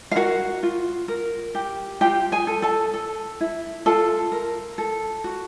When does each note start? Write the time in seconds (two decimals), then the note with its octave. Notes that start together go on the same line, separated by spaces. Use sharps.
0.11 F5
0.15 F#4 A#4 F#5
0.63 F4
1.08 A#4
1.55 G4
2.01 F4 G4 G5
2.32 G#4 G#5
2.47 A4
2.62 A4 A5
2.94 A4
3.40 E4
3.86 F4 A4 A5
4.32 A#4
4.78 A4
5.24 F#4